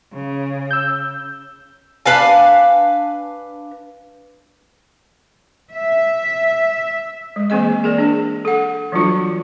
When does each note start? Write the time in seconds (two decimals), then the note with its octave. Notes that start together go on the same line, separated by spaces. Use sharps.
0.13 C#3
0.71 E6 G6
2.06 D4 B4 F5 G#5
5.73 E5
7.36 G#3
7.50 E3 A#3 C4 G#4 D#5
7.84 G#4 A#4 D5
7.98 D4 G#4
8.45 A4 F#5
8.92 E3 F#3 G3 D4 F4 F#4